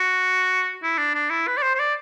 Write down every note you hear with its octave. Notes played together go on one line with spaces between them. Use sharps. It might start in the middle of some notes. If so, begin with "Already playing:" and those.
Already playing: F#4
E4
D4
D4
E4
B4
D5
C5
C5
D5